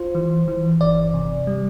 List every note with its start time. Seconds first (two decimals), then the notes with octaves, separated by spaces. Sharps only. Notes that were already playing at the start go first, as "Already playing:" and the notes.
Already playing: F4 C5
0.15 E3
0.48 E3
0.81 G1 D5
1.14 C3
1.47 G3